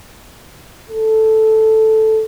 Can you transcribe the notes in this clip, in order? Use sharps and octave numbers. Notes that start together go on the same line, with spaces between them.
A4